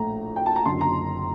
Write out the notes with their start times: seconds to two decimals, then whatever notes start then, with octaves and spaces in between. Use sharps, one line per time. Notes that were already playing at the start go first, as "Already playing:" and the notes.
Already playing: A#1 A2 A3 A#5
0.36 G5
0.46 A5
0.56 A#5
0.65 F#1 F#2 D3 C6
0.81 A#5